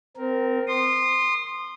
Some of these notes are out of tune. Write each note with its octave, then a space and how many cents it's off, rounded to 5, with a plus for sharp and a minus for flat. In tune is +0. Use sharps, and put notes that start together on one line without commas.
C4 -20 A#4 +0
C6 +0 D#6 -30